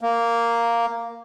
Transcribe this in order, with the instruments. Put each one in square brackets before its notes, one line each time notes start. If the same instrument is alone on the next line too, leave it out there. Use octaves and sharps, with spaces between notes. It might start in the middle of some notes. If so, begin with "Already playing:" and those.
[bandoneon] A#3